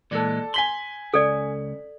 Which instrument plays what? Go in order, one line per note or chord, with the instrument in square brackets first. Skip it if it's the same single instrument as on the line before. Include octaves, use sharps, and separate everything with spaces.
[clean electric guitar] A#2 E3 G#3 [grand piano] A4 D5
[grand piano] G#5 B6 F#7 [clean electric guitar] C6
[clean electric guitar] C#2 C#4 [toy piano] A4 D5